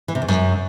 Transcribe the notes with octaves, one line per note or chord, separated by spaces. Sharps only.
E3
C3
E2
F#2